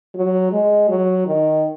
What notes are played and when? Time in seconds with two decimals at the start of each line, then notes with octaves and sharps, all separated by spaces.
0.15 F#3
0.52 G#3
0.89 F#3
1.27 D#3